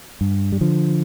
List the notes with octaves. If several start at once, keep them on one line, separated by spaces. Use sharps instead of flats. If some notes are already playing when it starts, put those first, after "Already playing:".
G2
G3
D3 F3